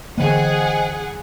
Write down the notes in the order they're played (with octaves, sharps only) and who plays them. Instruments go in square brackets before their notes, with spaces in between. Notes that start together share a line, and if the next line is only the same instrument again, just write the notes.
[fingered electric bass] D3 E3 A#3 [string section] G#4 F#5 [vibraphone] C5 D#5 G5